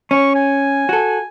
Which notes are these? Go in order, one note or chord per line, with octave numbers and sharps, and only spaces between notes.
C#4 C#6
G#5
F#4 A4